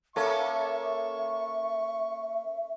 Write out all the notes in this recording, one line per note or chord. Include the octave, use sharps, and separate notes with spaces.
A#3 C#4 A4 E5 C#6